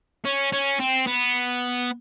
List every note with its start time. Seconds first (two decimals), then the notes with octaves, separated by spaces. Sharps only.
0.25 C#4
0.52 C#4
0.80 C4
1.07 B3